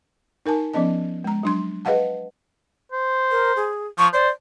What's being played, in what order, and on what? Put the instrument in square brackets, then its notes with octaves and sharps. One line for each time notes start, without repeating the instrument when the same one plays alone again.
[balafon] D#4 A#4 G#5 A5
F3 B3 C#4 D#5 A5
G#3 A#5
F#3 D4 C6
G#4 B4 D#5 F5 F#5 A5
[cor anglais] C5
[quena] A#4
G#4
[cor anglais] F3 [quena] C#6
[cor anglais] C5 [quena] D5